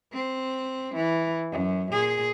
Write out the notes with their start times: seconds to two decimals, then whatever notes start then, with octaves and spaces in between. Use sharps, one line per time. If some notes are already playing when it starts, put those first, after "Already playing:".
0.13 C4
0.95 E3
1.52 F#2
1.92 A#2 G#4